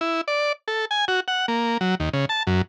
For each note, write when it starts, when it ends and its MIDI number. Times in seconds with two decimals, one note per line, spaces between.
0.01 0.21 64
0.28 0.52 74
0.68 0.85 69
0.91 1.05 80
1.08 1.20 66
1.28 1.46 78
1.48 1.78 58
1.81 1.95 54
2.00 2.09 39
2.13 2.25 49
2.29 2.43 81
2.47 2.62 42